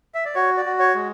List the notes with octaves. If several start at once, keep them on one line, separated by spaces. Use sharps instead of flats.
E5
D5
F#4 C#5
D5
F#4
C#5
G#3